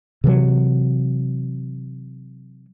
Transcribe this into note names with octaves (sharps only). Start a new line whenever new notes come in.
C3 E3 F#3